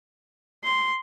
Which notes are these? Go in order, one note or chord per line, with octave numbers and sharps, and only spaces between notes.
C6